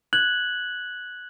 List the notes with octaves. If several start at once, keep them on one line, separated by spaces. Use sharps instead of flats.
F#6 G#6 F#7